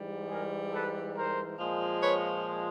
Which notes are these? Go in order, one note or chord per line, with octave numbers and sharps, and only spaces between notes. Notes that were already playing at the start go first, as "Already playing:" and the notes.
Already playing: G#2 E3 G3
G#4 A#4
A4 B4
A#4 C5
A#2 F3 G#3
B4 C#5